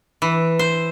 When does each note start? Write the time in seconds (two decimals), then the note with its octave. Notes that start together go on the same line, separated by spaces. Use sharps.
0.22 E3
0.59 C5